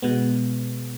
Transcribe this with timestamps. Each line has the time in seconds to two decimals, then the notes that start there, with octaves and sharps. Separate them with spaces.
0.02 B2 G#3 B3